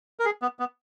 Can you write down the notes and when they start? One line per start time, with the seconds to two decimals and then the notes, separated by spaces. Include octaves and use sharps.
0.19 A#4
0.25 G#4
0.42 B3
0.59 B3